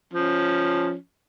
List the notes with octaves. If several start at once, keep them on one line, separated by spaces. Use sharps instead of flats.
F3 C#4